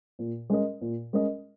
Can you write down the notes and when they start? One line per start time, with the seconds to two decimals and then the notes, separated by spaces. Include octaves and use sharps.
0.19 A#2
0.50 G#3 C#4 A#4 D#5
0.81 A#2
1.13 G#3 C#4 A#4 D#5